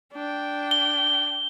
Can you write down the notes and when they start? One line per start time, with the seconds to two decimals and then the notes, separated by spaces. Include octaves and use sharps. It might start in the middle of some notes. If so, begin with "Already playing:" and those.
0.13 D4 G5
0.71 G7